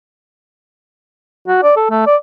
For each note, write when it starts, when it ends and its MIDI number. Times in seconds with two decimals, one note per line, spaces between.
1.48 1.60 66
1.63 1.72 74
1.76 1.89 69
1.90 2.03 57
2.07 2.16 74